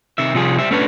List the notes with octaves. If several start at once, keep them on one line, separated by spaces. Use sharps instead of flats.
C3 D#3 E5
C3 F3 G3 F4 G#4
G3 C5 E5
A3 C#4 D4 F#4 B4 C#5